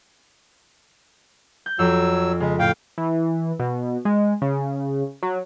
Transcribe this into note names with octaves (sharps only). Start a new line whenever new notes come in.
G6
F2 F#3 E6
C#3 G#3
A2 F5 G5
E3
B2
G#3
C#3
F#3